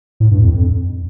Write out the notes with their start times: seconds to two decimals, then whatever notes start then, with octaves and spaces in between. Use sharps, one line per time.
0.20 A2
0.31 G2
0.42 F2
0.53 F2